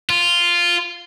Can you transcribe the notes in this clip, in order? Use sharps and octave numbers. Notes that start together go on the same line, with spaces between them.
F4